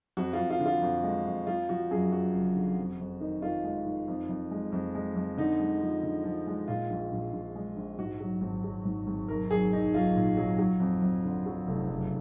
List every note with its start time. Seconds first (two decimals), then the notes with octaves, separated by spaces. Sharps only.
0.17 F2 F#4
0.33 F4
0.38 F2
0.50 F4
0.60 D3
0.66 F4
0.82 F2
1.04 G#3
1.25 F2
1.47 F3 F4
1.69 F3 F#4
1.91 F#2 G#4
2.12 F3 F#4
2.34 F#1
2.56 D3
2.77 F2
3.00 F2
3.21 D#3
3.42 D#3 F4
3.64 G#3
3.85 D#3
4.08 F2
4.29 F2
4.51 G#3
4.72 F2
4.95 G#3
5.16 F2
5.37 D3 D#4
5.60 G#3
5.81 F3
6.03 D3
6.24 F3
6.47 G#3
6.68 A#2 F4
6.90 A#1
7.12 A#1
7.33 A#1
7.56 G#3
7.76 A#1
7.98 G#2 F#4
8.21 F#3
8.41 G#1
8.64 F#3
8.85 G#1
9.07 G#1
9.28 B1 A#4
9.50 F#3 G#4
9.72 B1 D#4
9.94 B1 F4
10.15 A#2
10.37 F#3
10.59 F#3
10.80 F2
11.02 F2
11.24 D3
11.46 F#3
11.68 F1
11.89 F#1